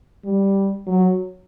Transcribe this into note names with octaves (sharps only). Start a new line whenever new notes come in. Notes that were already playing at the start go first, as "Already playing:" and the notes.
G3
F#3